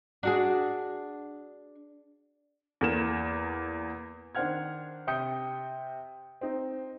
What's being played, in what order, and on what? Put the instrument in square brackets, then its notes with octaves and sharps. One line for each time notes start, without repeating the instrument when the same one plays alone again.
[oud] D4 F#4 G#4
[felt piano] E2 A#3 E7
[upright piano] D#3 D4 C5 F#5 F6 G#6
C3 G5 D#6 G6 C#7
C4 D#4